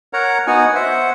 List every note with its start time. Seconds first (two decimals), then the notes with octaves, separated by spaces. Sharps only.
0.13 A#4 C#5 F#5 A#5
0.47 B3 D#4 F#4 F#5 G#5
0.75 C5 E5 F#5